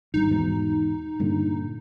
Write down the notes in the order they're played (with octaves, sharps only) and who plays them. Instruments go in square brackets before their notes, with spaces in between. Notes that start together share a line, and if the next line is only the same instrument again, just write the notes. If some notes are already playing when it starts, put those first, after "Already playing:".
[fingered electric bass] G#1 G2 [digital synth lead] D#4
[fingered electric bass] E2 G#2 B2
G2 A#2 D3